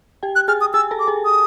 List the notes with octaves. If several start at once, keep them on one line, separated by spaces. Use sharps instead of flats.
G4 G5
F#6
G#4 G#5 F6
D#6
G#4 G#5 E6
A4 A5
D6
G#4 G#5
D#6